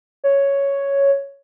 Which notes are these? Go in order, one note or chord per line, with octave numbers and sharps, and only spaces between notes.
C#5